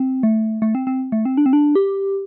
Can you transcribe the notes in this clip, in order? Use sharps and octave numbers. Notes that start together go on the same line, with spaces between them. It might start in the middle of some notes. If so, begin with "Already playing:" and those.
Already playing: C4
A3
A3
C4
C4
A3
C4
D4
C4
D4
G4